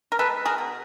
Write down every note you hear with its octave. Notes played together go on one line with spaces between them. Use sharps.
A#4
G#3 A4 B4
G#4 A#4
B2